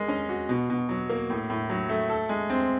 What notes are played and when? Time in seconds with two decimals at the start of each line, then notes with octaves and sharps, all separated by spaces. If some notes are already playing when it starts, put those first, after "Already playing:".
Already playing: G#3 A#4
0.08 C#4
0.29 F#4
0.49 B2
0.70 B2
0.89 F#3
1.10 A#3
1.30 A2
1.50 A2
1.69 F#3
1.89 A3
2.09 A4
2.29 G#3
2.50 C4